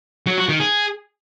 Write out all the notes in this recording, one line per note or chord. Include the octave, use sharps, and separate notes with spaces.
F#3
F#4
D#3
G#4